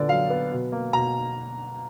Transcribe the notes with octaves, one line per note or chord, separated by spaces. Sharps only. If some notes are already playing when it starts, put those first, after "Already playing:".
Already playing: A#2 D3 B3 D5
F#3 F5
B3
B2
A#3
B2 A#5